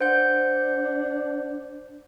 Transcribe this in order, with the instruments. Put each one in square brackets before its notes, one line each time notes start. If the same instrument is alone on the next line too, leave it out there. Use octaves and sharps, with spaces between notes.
[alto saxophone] D4 [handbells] C5 F#5 G6